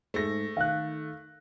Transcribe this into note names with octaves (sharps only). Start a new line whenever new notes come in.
G#2 A3 G#4 A#6
D#3 F5 F#6